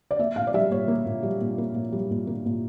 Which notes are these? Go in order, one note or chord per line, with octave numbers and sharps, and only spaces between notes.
D5
A#3 E5
A#2 F5
D5
G3 E5
A#2 C#5
A#3
A#2
G3
A#2
A#3
A#2
G3
A#2
A#3
A#2